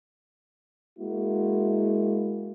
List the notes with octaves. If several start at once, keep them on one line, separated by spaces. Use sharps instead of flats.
G#3 A#3 E4 F#4